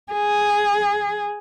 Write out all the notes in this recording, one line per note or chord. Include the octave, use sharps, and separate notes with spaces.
G#4